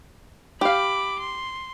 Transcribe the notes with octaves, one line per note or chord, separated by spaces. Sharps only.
G4 F5 B5 D6
C6